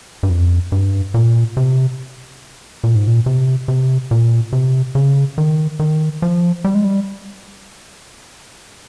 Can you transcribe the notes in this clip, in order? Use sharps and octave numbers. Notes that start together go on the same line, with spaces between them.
G2
F2
G2
A#2
C3
A#2
G#2
A#2
C3
C3
A#2
C3
C#3
D#3
D#3
F3
G3
G#3
G3